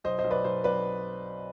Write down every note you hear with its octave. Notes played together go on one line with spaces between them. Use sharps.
B1 C5 D#5
C5 D#5
B1
B4 D5
B1 C5
B1 B4 D5